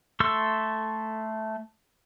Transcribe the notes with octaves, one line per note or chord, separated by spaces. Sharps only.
A3 A4 C6 C#6 E6